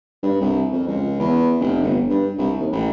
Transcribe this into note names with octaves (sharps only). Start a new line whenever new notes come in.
G2
C2
F2
C#2
E2
F1
G1
G2
C2
D#2
A1